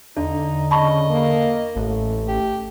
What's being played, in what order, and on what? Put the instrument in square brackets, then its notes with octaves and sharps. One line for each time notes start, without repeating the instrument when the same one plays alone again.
[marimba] E2 [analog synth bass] D3 [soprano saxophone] D#4
[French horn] C#3 [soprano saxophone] D#5 [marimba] A5 B5 C#6
[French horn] A#3
[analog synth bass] A1 [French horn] A3
[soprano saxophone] G4